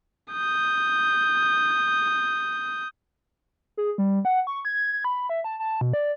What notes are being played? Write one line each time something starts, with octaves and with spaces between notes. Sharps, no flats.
D#6 G6
G#4
G3
F#5
C#6
G#6
G#6
B5
E5
A5
A5
B2
D5